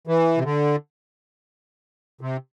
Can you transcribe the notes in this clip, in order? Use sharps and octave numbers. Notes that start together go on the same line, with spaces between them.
E3
C3
D3
C3